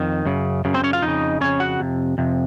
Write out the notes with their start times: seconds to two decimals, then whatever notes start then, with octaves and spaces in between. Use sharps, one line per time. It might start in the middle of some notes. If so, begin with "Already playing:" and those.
Already playing: F2 D#3
0.26 F#2 C#3
0.65 F#2 C#3
0.74 C4 C5
0.84 C#4 C#5
0.93 F4 F5
1.02 F2 C#3 D#4 D#5
1.41 F2 C#3 C#4 C#5
1.60 F#4 F#5
1.80 F2 C3
2.18 F2 C3